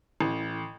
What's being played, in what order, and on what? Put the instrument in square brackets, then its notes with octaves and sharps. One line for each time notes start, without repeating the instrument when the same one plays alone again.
[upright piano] A1